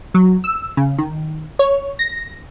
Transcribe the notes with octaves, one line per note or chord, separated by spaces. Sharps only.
F#3
E6
C#3
D#3
C#5
A#6